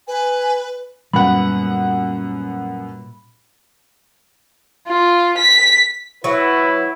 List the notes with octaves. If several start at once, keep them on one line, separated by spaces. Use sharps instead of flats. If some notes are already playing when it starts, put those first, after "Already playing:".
B4 G#5
F#2 A#2 G3 B3 F#5 B5
F4
B6
F#3 E4 B4